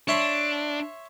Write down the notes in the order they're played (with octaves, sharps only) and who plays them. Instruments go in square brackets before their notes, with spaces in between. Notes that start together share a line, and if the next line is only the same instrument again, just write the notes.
[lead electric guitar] D4 [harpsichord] C#5 E5 C6